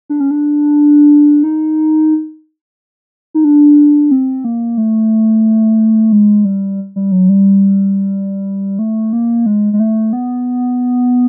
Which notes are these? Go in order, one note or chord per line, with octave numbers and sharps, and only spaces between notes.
D4
C#4
D4
D#4
D#4
D4
C4
A#3
A3
G#3
G3
G3
F#3
G3
A3
A#3
G#3
G#3
A3
B3